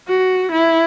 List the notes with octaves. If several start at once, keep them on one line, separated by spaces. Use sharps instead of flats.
F#4
E4